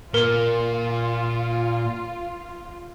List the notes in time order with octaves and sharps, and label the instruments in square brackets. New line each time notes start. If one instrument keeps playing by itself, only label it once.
[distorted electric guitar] A#2 [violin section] F4 [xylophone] A#4